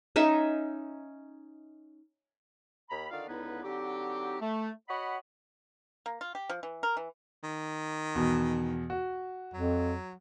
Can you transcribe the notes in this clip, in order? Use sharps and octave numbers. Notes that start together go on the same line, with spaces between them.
C#4 D#4 E5
D#2 A#5 B5
D3 D#3 D4 F4 D5 F5
C#2 D3 B3 D#4 E4 B4
D3 F#3 C4 D#4 G4
A3
F#4 C#5 D#5 F#5 B5
A#3
F4
G4
F3
E3
A#4
E3
D#3
E2 B2
F#4
F2 F#3